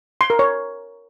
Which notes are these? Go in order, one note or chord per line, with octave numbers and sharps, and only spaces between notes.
C6
A#4
C#5